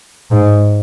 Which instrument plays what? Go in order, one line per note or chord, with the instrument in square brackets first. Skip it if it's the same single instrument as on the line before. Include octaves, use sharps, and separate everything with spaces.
[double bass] G#2